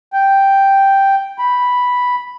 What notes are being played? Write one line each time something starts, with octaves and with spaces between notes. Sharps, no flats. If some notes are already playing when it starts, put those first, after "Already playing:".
G5
B5